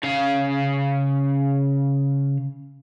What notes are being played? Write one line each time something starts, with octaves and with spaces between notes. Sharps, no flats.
C#3 F5